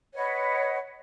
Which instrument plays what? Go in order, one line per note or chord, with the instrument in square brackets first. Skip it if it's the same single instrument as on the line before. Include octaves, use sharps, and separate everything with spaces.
[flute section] B4 C#5 D#5 F#5